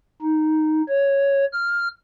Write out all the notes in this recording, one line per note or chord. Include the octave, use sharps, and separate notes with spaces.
D#4
C#5
F6